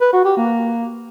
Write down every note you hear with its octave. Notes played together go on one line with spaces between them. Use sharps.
B4
F#4
G4
A#3